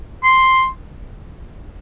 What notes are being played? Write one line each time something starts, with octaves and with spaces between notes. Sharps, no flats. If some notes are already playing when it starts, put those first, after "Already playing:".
C6